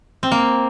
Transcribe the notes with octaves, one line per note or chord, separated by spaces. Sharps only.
C4
A#3